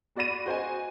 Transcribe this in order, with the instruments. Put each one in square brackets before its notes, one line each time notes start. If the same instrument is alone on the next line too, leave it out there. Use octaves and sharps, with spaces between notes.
[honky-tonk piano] B3 F#4 D5 B5 A#6 D#7
F#4 C5 D#5 G#5